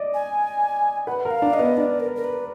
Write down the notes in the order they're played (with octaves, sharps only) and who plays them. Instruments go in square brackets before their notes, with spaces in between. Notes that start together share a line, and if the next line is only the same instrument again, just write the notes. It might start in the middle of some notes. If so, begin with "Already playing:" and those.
Already playing: [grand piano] D5 D#5
[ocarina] G#5
[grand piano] B4 [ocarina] F#5
[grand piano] A#4
[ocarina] F5
[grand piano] D4
[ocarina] D#5
[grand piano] B3
[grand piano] D4 [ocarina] D5
[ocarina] A#4
A#4
B4